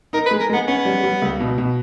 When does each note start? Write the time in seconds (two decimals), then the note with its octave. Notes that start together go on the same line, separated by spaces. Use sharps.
0.13 D#4 A#4
0.26 B4
0.31 G#3
0.40 A#4
0.49 G#3 B3
0.67 B3 C#4
0.85 G3
1.04 G3
1.22 C#2
1.40 B2
1.58 B2